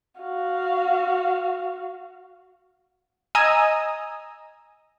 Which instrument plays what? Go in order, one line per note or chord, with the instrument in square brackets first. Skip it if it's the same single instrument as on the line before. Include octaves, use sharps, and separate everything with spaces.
[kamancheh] F#4 F5
[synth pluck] D#5 G#5 A#5 D#6 E6